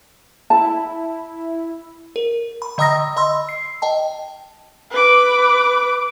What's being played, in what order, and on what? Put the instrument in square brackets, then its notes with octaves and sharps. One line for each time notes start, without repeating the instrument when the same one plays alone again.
[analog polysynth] E4 [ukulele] A5
[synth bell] A#4
B5
D3 D#5 A#5 D#6 E6 A#6
D#5 B5 C6 E6
C7
D#5 G5 A5
[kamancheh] B4 D6